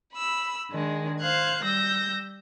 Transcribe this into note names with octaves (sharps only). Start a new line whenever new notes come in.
B5 E6
D#3 G#3 D4
C5 F5 F#6 G#6
G3 E6 G6 A#6